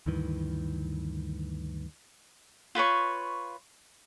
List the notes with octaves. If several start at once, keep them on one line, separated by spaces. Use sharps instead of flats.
D2 G2 D#3 E3
F4 B4 C#5 C#6